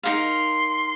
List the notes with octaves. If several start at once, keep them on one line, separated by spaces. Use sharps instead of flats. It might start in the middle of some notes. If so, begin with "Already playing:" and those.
D#4 G4 A#4 F5 C6